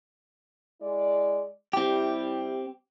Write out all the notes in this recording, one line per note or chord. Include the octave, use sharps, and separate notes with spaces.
G#3 E4 D5
G3 C4 E4 G4